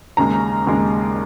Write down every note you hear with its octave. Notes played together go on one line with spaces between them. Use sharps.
D#2 C#3 G#3 A#5
D#2 C#3 G#3